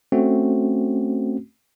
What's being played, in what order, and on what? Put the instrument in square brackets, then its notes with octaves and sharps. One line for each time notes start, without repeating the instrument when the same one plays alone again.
[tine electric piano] A3 C4 C#4 F#4